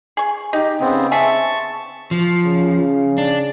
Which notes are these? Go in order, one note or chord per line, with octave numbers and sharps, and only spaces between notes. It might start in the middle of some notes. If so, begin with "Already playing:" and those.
G#4 C#6
D#4 G4
C#3 B3 C4
G#4 E5 A5 C#6
F3
C#3
D4